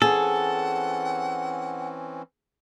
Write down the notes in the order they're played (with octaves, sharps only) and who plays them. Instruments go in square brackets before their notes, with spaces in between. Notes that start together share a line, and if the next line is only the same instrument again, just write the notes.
[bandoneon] E3 C4 C#4 [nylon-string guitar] G#4 [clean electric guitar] A4 [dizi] F#5